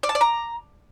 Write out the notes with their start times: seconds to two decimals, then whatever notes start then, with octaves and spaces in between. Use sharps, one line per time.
0.03 D5
0.09 A5
0.15 D5
0.21 A#5